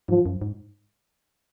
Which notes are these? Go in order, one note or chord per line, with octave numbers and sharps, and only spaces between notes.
G#2 F3
F#2
G#2